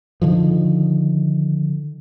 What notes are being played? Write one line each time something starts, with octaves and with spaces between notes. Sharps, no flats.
D3 D#3 F3